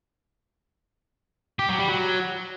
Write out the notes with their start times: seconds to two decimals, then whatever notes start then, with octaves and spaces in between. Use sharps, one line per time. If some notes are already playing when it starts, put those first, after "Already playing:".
1.59 G4
1.69 F#3
1.79 G3
1.88 F#3